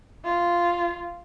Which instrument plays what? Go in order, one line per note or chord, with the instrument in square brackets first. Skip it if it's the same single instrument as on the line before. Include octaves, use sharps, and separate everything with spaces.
[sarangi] F4